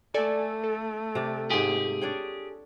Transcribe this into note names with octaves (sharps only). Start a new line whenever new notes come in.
A3 A4 D5 G#5
A4
C3 D5
G#2 F4 G4 G#4
D4 C#5 G5